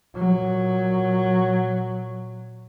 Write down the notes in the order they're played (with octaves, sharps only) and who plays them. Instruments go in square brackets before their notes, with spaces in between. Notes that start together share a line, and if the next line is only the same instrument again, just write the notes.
[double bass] A#2 F#3